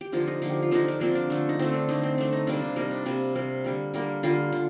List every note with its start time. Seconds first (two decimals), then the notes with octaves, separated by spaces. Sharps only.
0.01 G4
0.12 D3 F3 A#3 F4
0.27 D#4
0.42 D3 F3 A#3
0.50 G4
0.63 F4
0.71 D3 F3 A#3 D#4
0.88 D4
1.00 D3 F3 A#3 C4
1.15 D4
1.30 D3 A3
1.49 D#4
1.59 D3 A3 C4
1.74 D4
1.89 D3 A3 D#4
2.03 C4
2.18 D3 A3 D4
2.33 D#4
2.47 C3 G3 A#3 D4
2.61 D4
2.76 C3 G3 A#3 D#4
2.91 D4
3.06 C3 G3 A#3
3.35 C3 G3 A#3
3.64 D3 G3 A#3
3.94 D3 G3 A#3
4.23 D3 G3 A#3 F4
4.52 D3